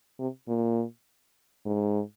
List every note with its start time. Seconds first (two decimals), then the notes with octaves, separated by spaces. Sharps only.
0.19 C3
0.48 A#2
1.66 G#2